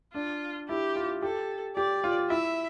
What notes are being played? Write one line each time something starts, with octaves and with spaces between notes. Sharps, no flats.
D4 F4
E4 G4
F4
G4 A4
G4 D5
F4
E4 E5